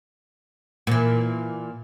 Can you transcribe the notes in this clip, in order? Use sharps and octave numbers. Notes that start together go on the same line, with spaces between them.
A#2 E3